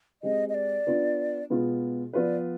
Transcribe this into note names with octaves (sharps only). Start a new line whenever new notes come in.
G#3 C4 G4 D#5
D#5
D5
B3 D4 F4
B2 G#3 B3 F4
F3 B3 F4 B4 D5